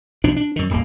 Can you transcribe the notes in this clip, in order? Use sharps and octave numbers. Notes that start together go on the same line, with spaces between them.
B1 B2 F3 D4
D4
F#2 D#3
D#1 G#1 D#2 A#3